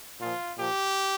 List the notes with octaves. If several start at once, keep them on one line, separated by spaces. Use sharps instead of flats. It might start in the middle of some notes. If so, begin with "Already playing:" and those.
A#2 F3 F4
A#2 F3 G4